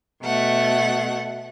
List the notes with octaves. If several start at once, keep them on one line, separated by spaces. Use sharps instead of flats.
B2 A3 F#5